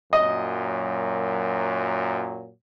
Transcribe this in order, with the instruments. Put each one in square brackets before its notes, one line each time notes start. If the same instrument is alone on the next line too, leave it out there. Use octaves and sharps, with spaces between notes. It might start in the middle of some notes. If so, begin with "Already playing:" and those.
[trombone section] F#2 A#2 F#3 [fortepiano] D#5